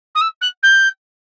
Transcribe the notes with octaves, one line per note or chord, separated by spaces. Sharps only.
D#6
E6
F#6
G6